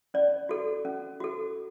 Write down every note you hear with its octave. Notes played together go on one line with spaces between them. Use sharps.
C#4 D5
F#4 A4
C#4
F#4 A4